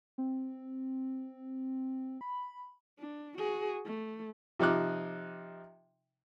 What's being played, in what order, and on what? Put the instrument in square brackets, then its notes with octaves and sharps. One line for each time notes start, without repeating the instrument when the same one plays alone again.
[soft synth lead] C4
B5
[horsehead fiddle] D4
F#4 G#4
A3
[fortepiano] C3 F3 D#4 D6 F#6